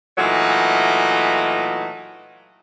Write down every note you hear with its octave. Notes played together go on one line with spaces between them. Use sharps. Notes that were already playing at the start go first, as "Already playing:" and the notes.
A#2 E3 F#3 A3 D#4